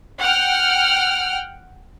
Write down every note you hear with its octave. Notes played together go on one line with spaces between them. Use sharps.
F#5 G5 F6